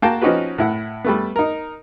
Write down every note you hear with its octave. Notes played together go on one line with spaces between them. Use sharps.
A#3 F#4 F5 G5 A5
F3 C#4 D#4 F#4 G4 B4
A2 E4 F#5
G3 A3 B3
D#4 A#4